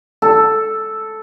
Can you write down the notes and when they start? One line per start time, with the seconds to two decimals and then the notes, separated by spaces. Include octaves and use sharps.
0.22 A4